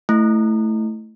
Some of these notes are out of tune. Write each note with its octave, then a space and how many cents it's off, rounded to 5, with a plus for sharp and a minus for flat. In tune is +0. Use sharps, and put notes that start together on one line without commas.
A3 +0 E4 +0